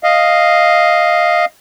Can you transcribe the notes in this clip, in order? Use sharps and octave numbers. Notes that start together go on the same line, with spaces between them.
D#5 F5